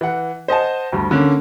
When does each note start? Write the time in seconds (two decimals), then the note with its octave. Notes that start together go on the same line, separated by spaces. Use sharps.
0.01 E3 F#5
0.48 C5 D#5 F#5 A5
0.92 D2 G2
1.11 D3 A#3 C#4